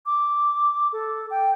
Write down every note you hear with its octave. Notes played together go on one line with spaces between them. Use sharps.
D6
A4
G5